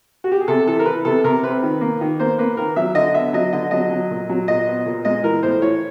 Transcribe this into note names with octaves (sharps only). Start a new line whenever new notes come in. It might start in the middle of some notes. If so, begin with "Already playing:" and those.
F#4
G4
G#4
C3 A4
E3 A4
A#4
E3 B4
C3 A4
C3 A#4
C4 B4
D#3
A#3
D#3
A#3 C5
A#3 B4
D#3 A#4
F#3 E5
D3 D#5
B3 E5
F#3 D#5
D3 D#5
F#3 D#5
F#3
A#2
F#3
A#2 D#5
B3
A#2
G#3 D#5
E3 A#4
A2 C5
E3 C#5